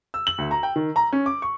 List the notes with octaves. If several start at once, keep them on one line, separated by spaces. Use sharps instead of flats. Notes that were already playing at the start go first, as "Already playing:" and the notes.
E6
F#7
D2
A#5
G5
D#3
A#5
C#4
D6
C#6